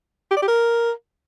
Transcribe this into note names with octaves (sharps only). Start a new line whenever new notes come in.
G4
D5
G4
A#4